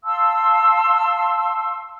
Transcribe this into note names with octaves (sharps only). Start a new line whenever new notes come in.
F5 A5 C6 E6